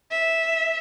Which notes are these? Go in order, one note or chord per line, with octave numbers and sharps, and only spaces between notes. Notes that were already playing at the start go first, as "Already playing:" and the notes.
E5